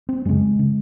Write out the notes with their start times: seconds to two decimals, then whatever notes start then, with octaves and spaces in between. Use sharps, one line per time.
0.09 C4
0.25 F#2 C#3 G#3
0.59 C#3